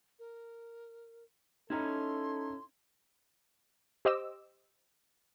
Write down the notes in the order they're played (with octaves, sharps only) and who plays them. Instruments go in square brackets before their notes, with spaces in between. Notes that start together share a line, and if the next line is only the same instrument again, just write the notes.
[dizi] A#4
[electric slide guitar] C#4 E4 [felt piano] D#4 A#5 [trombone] A4 [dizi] C6
[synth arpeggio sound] G4 C5 D#5 D6 E6